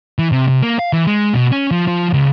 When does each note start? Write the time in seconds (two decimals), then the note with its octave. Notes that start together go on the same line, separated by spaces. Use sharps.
0.19 E3
0.32 C3
0.48 C3
0.63 A#3
0.79 F5
0.93 E3
1.07 G#3
1.34 B2
1.52 C#4
1.71 F3
1.88 F3
2.13 C#2